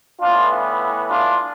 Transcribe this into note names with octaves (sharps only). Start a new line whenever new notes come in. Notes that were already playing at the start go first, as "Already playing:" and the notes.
A2 E3 B3 D4 F4
D4 F4